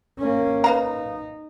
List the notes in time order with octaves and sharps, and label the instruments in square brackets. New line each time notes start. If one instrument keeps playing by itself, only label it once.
[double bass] A#3 C#4
[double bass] D#4 [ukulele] B4 F5 A#5